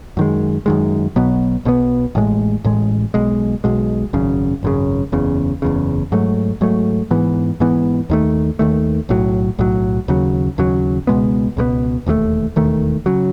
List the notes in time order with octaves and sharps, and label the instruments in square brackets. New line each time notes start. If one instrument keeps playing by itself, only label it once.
[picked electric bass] F#2 D#3 G#3
F#2 D#3 G#3
B1 B2 F#3 B3
B1 B2 F#3 B3
A1 A2 G#3
A1 A2 G#3
B1 B2 G#3
B1 B2 G#3
G#1 F#2 C#3
G#1 F#2 C#3
F#1 E2 C#3
F#1 E2 C#3
G#2 F#3 A3
G#2 F#3 A3
G#2 E3 B3
G#2 E3 B3
D#2 D#3 A3
D#2 D#3 A3
B1 A2 F#3
B1 A2 F#3
D#2 C#3 F#3
D#2 C#3 F#3
C#2 B2 G#3 B3
C#2 B2 G#3 B3
E1 D#2 D#3 A3
E1 D#2 D#3 A3
C#3 F#3